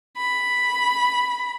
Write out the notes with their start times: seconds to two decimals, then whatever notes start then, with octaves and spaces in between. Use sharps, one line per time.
0.16 B5